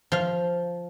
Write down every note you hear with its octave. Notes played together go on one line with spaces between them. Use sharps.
F3 F5